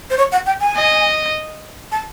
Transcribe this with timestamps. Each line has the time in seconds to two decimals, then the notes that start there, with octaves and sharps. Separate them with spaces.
0.10 C5
0.17 C#5
0.32 F#5
0.46 G5
0.61 G#5
0.76 D#5
1.92 A5